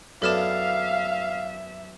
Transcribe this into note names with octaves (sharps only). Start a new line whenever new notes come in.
F#2 B3 D4 A4 E5 F5 F6 E7